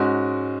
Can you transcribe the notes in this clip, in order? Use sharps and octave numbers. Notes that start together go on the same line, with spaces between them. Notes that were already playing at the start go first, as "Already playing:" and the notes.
Already playing: G#2 G#3 C#4 F#4